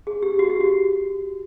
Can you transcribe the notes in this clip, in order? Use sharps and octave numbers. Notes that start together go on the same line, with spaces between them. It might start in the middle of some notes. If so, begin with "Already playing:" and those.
G#4
G4
F#4
G4
F#4